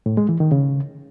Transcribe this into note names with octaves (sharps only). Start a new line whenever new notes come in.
A2
G#3
E3
D#3
C#3